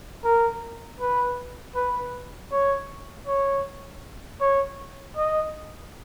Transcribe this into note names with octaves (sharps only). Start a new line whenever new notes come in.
A#4
B4
B4
C#5
C#5
C#5
D#5